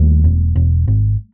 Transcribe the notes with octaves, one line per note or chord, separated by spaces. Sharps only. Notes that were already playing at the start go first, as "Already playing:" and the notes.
Already playing: D#2 G3 A3
E1
E1
G#1